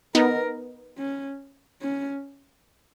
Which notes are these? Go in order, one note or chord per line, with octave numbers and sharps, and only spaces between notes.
B3 D#4 A#4
C#4
C#4